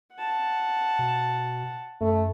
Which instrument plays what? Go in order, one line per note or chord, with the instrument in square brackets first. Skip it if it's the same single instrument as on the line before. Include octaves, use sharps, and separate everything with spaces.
[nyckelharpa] F#5 A5
[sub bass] B2
[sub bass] F#2 [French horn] A3